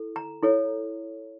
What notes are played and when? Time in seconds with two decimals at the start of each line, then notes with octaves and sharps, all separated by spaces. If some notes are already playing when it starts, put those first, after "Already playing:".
Already playing: E4 A4
0.16 A#5
0.43 E4 A4 C#5